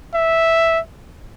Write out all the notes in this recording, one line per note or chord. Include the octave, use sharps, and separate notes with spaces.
E5